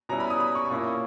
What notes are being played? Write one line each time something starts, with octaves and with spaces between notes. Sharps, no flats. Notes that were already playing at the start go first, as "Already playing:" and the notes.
B2 G3 C#4 E4 A#5
B5
D#6
B5
C#6
A#2 A#3 C#4 E4